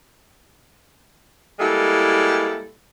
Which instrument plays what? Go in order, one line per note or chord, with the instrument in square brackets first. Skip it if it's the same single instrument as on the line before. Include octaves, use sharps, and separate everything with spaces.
[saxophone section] G3 G#3 A#3 E4 A4